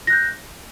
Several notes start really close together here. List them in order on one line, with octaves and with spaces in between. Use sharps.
A#6 F#6 G6